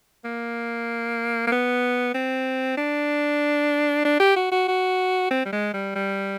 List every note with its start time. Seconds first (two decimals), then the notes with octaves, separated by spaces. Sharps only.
0.25 A#3
1.47 A#3
1.52 B3
2.14 C4
2.77 D4
4.05 D4
4.20 G4
4.36 F#4
4.52 F#4
4.68 F#4
5.31 C4
5.45 G3
5.52 G#3
5.74 G3
5.95 G3